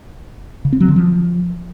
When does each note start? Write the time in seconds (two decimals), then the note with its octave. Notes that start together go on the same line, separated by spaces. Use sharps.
0.65 C#3
0.73 C4
0.80 F#3
0.88 D3
0.96 F3